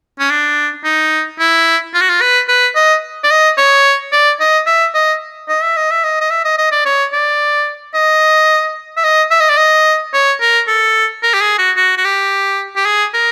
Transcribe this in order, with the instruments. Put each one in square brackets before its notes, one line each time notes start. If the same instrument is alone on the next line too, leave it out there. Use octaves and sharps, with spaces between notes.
[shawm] C#4
D4
D#4
E4
F4
F#4
F4
B4
B4
D#5
D5
D#5
C#5
D5
D#5
E5
D#5
D#5
E5
D#5
E5
D#5
D#5
E5
D#5
D#5
D5
C#5
D5
D#5
E5
D#5
E5
D#5
D5
D#5
C#5
A#4
A4
A#4
G4
G#4
F#4
F#4
F#4
G4
G4
G#4
A#4